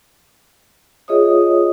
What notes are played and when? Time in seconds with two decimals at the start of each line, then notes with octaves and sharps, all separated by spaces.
1.08 F4 G#4 C#5 D#5 E5 D#6